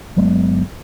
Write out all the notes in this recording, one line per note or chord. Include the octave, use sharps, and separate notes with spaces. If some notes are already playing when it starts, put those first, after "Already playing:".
G1 F#3 G#3 B3